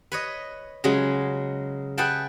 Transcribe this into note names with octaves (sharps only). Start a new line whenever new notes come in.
B4 C#5 D#5
C#3 F#3 G#3
G#4 B4 E5 F#5 G5 A5